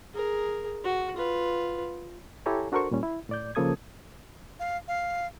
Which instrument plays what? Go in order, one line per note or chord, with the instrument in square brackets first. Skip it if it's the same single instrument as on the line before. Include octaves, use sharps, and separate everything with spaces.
[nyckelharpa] G#4 A#4
F#4
F4 B4
[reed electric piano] E4 G4 A4 C#5 G#5 A#5
D4 F#4 A4 A#4 C5 C#6
A#2 G3 C#4
E4
A2 D5 G6
C#3 F3 A#3 A4 D#6 G#6
[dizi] F5
F5